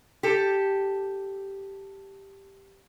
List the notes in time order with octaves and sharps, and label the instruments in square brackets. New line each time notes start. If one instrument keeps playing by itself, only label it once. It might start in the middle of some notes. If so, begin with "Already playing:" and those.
[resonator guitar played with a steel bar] G4 A4